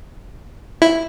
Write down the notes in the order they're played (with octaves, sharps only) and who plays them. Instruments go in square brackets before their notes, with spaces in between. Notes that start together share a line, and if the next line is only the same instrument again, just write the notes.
[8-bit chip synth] E4